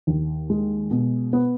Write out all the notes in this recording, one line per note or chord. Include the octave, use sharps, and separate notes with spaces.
D#2
G#3
B2
B3